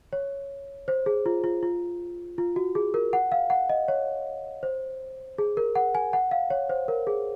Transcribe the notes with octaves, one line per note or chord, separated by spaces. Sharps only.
C#5
C5
G#4
F4
F4
F4
F4
F#4
G#4
A#4
F#5
F5
F#5
D#5
C#5
C5
G#4
A#4
F#5
G#5
F#5
F5
C#5
C5
A#4
G#4